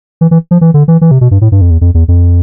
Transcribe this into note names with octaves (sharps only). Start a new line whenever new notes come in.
E3
E3
F3
E3
D3
E3
E3
C3
B2
G2
A2
G2
F2
E2
F2
E2
F2